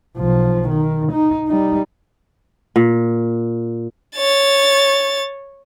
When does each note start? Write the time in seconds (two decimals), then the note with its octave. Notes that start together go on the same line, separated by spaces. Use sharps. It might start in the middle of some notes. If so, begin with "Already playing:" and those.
0.18 B1 F3
0.69 D#3
1.12 D#4
1.48 G3 D#4
2.76 A#2
4.16 C#5 A6